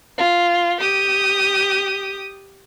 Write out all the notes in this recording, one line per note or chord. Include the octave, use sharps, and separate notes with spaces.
F4
G4 D#6